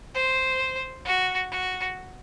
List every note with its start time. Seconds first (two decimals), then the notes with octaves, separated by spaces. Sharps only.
0.15 C5
1.05 F#4
1.51 F#4